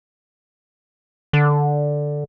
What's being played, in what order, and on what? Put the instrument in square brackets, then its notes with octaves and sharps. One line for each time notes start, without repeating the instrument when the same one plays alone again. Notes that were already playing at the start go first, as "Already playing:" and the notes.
[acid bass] D3